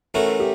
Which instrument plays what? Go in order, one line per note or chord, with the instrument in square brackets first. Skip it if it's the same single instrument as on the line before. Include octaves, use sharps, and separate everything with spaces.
[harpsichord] E3 A3 C#4 F#4 [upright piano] A#4
[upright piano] G4